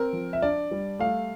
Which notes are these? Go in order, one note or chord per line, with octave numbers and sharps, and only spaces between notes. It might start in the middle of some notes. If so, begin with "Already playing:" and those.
Already playing: C4 A#4
F3
E5
D4 D5
G3
A3 F5